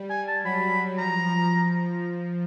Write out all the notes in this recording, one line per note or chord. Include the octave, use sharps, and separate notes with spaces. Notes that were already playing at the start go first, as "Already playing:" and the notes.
Already playing: G3
G#5
A5
F#3 B5
F3 A#5